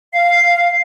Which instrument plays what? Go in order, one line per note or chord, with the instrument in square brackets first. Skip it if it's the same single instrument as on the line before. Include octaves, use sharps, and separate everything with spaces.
[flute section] F5 [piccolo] C7